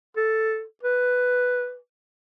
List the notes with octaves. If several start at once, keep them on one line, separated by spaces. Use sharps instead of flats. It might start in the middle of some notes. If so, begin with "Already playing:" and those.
A4
B4